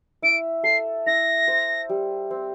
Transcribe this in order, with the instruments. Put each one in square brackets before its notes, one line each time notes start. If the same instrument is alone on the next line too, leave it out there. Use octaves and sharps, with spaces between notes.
[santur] E4 [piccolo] D7
[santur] A4 [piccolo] C7
[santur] E4 [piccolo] A#6
[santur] C5
G3
C4